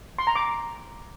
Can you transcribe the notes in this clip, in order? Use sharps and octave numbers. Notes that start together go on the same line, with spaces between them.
C6
A#5
D6